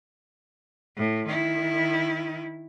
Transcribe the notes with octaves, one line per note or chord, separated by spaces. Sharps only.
A2
D#3 E4